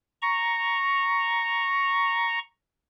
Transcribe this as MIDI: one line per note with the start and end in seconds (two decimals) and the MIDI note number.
0.22 2.39 82
0.22 2.39 85